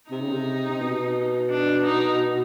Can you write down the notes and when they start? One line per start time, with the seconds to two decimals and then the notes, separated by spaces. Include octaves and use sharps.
0.11 C3 D#4
0.21 C#3
0.32 C3
0.70 C3
0.81 B2
1.50 D4
1.85 D#4